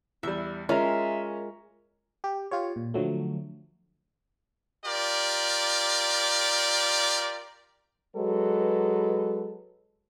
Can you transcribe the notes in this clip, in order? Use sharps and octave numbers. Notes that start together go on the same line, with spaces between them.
E2 G3 E5
G#3 C#4 F4 A#4 E5 A#5
G4
F4 G4 C#5
A#2
D3 F3 F#3 A3
F4 G4 A#4 D5
F#3 G#3 A4 B4